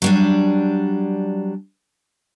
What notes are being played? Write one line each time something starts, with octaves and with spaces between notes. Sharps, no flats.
F#3 G3 D4